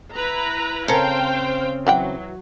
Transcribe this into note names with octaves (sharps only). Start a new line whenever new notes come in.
E4 B4 A#5
C#3 C4 C#4 A4 A#4 C5 F5 G5
E3 F#3 F#5 G5